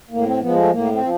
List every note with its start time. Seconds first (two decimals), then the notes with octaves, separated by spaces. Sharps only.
0.11 A2 A#3
0.26 C4
0.41 F3 G#3 B3
0.56 A3
0.71 A2 A#3
0.91 C4
1.01 F3